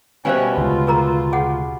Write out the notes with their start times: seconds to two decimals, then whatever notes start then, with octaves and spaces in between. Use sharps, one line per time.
0.25 B2 G3 C#4 C5 E5 F5 G#5
0.57 D2 C#3 G#3 F4
0.87 G#4 A#4 A#5
1.33 G#4 F#5